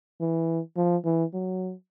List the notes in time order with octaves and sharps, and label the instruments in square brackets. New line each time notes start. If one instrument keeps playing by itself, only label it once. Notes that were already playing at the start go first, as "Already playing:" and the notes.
[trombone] E3
F3
E3
F#3